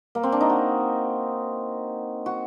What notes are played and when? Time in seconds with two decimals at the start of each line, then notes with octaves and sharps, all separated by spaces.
0.15 A#3
0.23 C4
0.32 D4
0.41 D#4
0.50 F#4
2.26 F#4